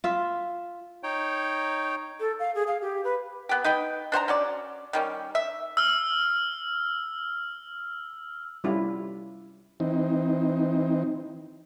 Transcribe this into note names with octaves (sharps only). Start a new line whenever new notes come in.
F4 E5
D#4 C#5 G5
A4
F5
G#4
F5
G4
B4
B3 G4
D#4 B4 G5
D4 C5 F#5 A#5
C#4 F#4 D5
D#3 G3 C#4
E5
E6 F6
G3 C#4 E4 F4
E3 C4 D#4